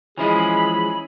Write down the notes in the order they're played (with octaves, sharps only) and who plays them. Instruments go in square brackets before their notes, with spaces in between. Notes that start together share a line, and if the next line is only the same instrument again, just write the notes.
[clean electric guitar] E3 F3 G#3 [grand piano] C#4 E4 D#5 [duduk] G#4 [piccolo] B5